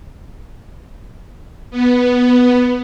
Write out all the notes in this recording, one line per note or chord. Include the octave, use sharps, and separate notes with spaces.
B3